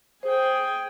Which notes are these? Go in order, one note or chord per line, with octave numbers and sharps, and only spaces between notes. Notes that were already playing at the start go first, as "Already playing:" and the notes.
G#4 C5 G5